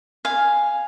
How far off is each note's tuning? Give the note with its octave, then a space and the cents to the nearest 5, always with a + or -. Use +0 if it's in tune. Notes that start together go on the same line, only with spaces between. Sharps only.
F5 +0 G#5 +0